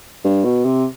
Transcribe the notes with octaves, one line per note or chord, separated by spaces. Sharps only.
G2
B2
C3